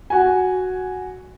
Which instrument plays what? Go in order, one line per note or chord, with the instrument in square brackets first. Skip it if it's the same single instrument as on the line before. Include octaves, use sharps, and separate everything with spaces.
[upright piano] F#4 G#5